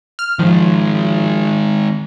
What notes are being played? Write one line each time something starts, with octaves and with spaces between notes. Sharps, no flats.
F6
D#3 F3 G#3